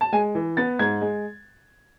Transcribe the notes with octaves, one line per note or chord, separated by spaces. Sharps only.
A5
G#3 G#5
E3
B3 A6
G#2 G#6
G#3